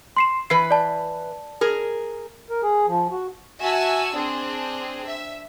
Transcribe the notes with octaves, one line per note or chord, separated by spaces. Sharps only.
C6 C7 E7
E3 B4 C7
D5 A5
G#4 A#4
A#4
G#4
F3
F#4
F#4 E5 G#5 A5 E6
C4 D4 G#4
E5